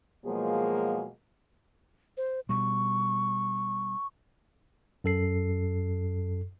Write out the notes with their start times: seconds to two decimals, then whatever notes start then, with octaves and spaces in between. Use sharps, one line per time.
0.25 B2 F3 F#3 G#3 A#3 G#4
2.17 C5
2.49 B2 G3 C#6
5.04 F#2 A4 C7